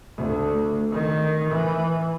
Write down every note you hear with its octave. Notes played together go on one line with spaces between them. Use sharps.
D2
D#3
E3